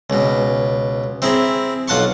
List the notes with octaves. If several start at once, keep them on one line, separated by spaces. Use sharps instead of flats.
C#2 B2
C4 E4 G#4 A#5
B1 F4 F#5 A5 C6 C#6